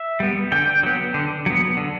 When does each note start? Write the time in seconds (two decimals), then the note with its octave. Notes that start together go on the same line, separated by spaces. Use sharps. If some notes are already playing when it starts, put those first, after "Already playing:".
Already playing: E5
0.20 G3 B3
0.52 D3 G5
0.83 F#3 B3
1.14 D3
1.46 F#3 B3
1.77 D3